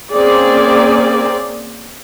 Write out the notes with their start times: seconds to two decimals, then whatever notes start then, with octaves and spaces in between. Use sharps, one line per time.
0.13 A#3 C4 C#4 G#4 D5